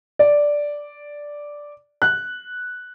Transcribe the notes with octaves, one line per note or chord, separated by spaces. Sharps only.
D5
F#6